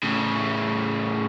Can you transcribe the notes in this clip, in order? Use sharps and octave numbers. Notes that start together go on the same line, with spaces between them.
A2 C#3